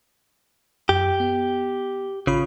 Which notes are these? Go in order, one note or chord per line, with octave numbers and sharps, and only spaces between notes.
F#2 G4
B3
A1 C#3 F4 B5